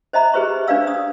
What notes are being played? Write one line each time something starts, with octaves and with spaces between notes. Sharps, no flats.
C5 D#5 E5 A#5 B5
G4 G#4 B4 C5 E5 C#6
D4 B4 D5 F5 E6
D#6